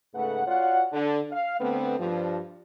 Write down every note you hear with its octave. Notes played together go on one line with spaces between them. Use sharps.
G#2 C#3 A3 A4 B4 F#5
F4 F#4 C#5 D5 F#5
D3
F5
D3 A3 B3 C4
G2 F3